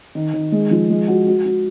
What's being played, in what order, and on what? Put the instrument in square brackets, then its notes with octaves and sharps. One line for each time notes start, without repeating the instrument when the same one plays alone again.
[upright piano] D#3
D#3
G#3
F3
G#3
F#4
F#4
F#4